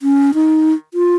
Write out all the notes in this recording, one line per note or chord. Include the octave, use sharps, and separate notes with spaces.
C#4
D#4
F4